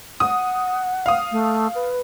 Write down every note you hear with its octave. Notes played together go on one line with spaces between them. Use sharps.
F#5 D#6
F5 D#6
A3
B4